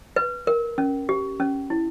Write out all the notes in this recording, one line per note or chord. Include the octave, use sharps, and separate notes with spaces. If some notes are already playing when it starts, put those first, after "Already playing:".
B4
A#4
C#4
G4
C#4
E4